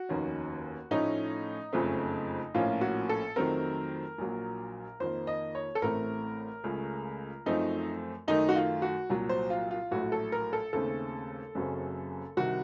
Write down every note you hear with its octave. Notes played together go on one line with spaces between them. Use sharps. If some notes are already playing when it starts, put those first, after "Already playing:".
Already playing: F#4
F1 D#2 D#3 A#3 C#4
A2 F3 A3 C#4 D#4
F#1 F2 C#3 A3 C4
A#1 A2 F3 A#3 C#4 F4
F#4
A4
F2 D#3 F#3 A3 C4 A#4
A#1 A#2 F#3
F2 D#3 A#3 C5
D#5
C#5
A4
A1 A2 A3 C4 A#4
C#2 C#3 A3
F#2 F3 A3 C4 D#4
F#2 D#3 A3 D#4
F#4
F4
F#4
C2 A#2 F#3
C5
F4
F4
A#1 A2 F#3 A3 F#4
A4
A#4
A4
D#2 C#3 A3 C4 A4
F#1 F#2 C#3 F#3 C4
C2 C3 D#3 F#4